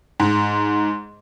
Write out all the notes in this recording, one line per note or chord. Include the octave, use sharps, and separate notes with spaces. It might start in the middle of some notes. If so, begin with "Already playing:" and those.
G#2